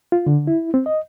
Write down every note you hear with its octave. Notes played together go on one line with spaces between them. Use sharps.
F4
D3
E4
C4
D#5